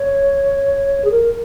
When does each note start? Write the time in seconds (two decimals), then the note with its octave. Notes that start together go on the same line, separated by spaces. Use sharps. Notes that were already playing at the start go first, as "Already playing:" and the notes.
Already playing: C#5
1.04 G#4
1.11 A#4